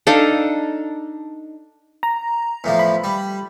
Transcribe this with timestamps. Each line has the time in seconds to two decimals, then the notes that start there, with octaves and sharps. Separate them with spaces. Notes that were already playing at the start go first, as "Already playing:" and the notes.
0.07 D4 D#4 A4 F5
2.03 A#5
2.64 E2 A2 F3
2.79 B5
3.04 G3